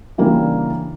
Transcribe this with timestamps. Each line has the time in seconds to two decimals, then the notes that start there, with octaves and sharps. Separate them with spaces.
0.18 C#3 E3 G3 A#3 D4